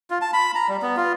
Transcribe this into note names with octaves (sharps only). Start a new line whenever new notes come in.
F4
A5
B5
A#5
G3
B3
F4